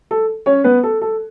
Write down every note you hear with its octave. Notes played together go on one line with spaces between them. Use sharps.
A4
C#4 C#5
B3 B4
A4
A4